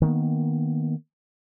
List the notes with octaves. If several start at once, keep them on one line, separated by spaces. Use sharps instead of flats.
D#3 A#3 B3